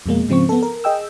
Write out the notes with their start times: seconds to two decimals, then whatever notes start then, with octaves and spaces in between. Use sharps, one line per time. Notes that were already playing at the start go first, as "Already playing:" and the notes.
0.06 F2 B2 G#3 A#3
0.28 G#2 C#3 F3 C4 C#6
0.49 B3 A4
0.62 A#4
0.84 G#4 D#5 G5 E6